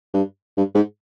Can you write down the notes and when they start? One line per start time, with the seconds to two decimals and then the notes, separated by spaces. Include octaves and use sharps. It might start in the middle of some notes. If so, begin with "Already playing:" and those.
0.14 G2
0.57 G2
0.75 G#2